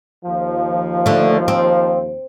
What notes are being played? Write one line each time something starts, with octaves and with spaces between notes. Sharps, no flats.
D#2 F3
D3 A3
C4